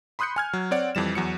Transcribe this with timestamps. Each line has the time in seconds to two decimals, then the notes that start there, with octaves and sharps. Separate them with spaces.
0.19 B5 C6 D#6 F#6 G6 C#7
0.36 G#5 F6 G#6
0.53 F#3
0.71 C4 C#5 D5 F#5
0.95 F2 E3 G3 E7
1.15 E2 F#3 C#7